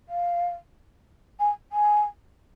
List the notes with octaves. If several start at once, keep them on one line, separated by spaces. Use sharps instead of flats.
F5
G#5
G#5